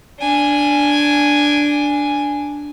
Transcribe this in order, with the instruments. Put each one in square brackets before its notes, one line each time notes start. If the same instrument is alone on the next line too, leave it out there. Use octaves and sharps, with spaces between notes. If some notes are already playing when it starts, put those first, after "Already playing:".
[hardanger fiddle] D4 G#5